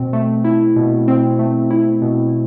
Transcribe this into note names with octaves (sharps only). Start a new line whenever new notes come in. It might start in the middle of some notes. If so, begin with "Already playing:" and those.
Already playing: B2 C4
A3
E4
B2
C4
A3
E4
B2